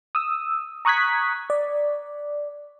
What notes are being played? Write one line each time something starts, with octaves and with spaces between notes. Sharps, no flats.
D#6 E6
A#5 C#6 D#6 F#6 G#6 B6
D5